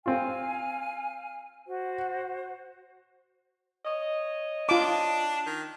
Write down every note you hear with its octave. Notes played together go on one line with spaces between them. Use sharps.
C4 F4 F5 G#5 F6
F#4 C5
C#5 D#5
D4 F4 D6
D#3